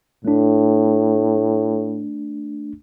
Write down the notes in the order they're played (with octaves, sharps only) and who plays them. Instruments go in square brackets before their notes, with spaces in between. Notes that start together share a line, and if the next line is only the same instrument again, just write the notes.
[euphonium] A2 [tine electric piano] A3 D4